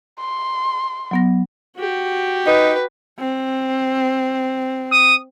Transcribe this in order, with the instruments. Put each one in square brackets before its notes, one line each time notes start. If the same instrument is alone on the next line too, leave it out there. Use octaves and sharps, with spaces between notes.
[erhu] C6
[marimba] F#3 B3 A#6
[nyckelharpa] F#4 G4
[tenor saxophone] D#4 [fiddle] B4
[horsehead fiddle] C4
[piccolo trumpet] D#6